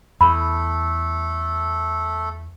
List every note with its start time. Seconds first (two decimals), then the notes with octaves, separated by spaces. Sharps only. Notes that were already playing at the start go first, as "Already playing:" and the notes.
0.21 E2 A3 A4 B5